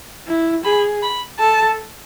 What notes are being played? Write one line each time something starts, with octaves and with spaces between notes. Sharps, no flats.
E4
G#4 B5
B5
A4 A5